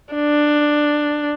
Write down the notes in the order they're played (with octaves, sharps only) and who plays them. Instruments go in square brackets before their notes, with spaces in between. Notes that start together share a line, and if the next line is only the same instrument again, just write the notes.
[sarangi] D4